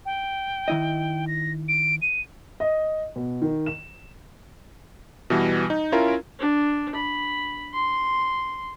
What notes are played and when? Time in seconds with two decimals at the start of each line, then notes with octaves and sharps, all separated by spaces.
0.06 G5
0.68 D#3 E4 D#5
1.27 A#6
1.68 D7
2.02 D#7
2.60 D#5
3.16 B2
3.42 D#3
3.66 E7
5.30 B2 E3 G3
5.70 D#4
5.92 C#4 E4 F4 A#4
6.39 D4
6.95 B5
7.73 C6